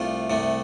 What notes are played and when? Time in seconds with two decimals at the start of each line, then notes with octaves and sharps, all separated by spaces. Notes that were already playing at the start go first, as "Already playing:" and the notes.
Already playing: C2 C3 A3 F4
0.30 C2 C3 A3